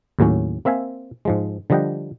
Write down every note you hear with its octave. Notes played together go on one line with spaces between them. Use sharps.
D#2 A2 F#3 C#4
A#3 C4 E5 F5 G#5
G#2 F3 G#3
D3 F3 G3 D#5 F#5 G5